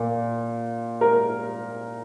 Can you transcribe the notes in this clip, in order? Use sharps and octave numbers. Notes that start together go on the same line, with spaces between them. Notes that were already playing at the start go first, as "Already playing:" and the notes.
Already playing: A#2
A#4